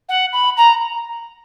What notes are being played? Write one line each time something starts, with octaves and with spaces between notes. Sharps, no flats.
F#5
B5
A#5